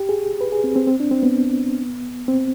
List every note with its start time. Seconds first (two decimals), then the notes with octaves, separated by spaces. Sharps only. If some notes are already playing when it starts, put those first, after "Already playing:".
Already playing: G4
0.09 G#4
0.41 B4
0.52 G#4
0.64 C4
0.76 C4
0.87 C4
1.00 D4
1.11 C4
1.23 B3
2.28 C4